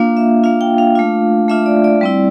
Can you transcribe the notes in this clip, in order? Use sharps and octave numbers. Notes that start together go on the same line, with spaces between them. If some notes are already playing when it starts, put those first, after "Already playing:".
Already playing: A#3 D4 F4 F5
E5
A#3 D4 F4 F5
G5
F5
A3 D4 F4
A3 D4 F4 E5
D5
D5
G3 C4 E4